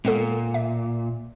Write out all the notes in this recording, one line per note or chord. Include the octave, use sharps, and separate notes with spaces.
A#2 G#3 B3 A4
E5